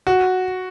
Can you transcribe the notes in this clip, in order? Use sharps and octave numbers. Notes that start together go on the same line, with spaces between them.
F#4